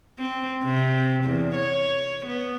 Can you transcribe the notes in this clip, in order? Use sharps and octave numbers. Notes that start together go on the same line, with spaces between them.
C4
C3
E2
C#5
B3